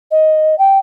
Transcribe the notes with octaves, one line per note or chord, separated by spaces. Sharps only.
D#5
G5